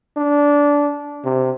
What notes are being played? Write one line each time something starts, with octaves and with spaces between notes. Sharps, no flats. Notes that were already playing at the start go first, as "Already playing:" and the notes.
D4
C3